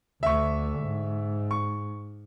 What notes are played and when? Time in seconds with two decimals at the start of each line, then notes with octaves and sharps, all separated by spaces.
0.23 D2 D3 E5 C#6
0.80 G#2
1.51 C#6